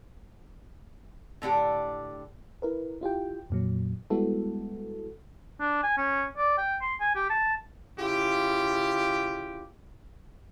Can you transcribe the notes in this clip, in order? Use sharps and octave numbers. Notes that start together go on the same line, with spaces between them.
A2 D3 D4 G4
E4 A#4 B4
E4 F4 G4 G5
F2 A#2 F#3
G3 G#3 B3 E4 F#4 A4
D4
G#5
C#4
D5
G5
C6
G#5
G4
A5
C#3 E4 F4 G4